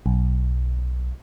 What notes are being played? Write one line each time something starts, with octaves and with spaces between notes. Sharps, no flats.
B1